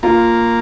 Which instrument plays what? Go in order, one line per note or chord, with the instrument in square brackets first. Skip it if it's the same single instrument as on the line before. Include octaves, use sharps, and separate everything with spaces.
[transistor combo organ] A#3 [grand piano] F4